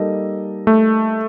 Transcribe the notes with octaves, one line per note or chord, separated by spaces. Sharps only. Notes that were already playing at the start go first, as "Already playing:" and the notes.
Already playing: G3 A#3 D#4 A4 D#5
A3